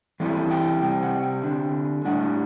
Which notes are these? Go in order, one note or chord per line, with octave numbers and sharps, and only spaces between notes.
E3 G3 C4 E4 A4
G5
C3 G3 C4 G5
F#5
G5
D3 G3 C4
A2 G3 D4 F#5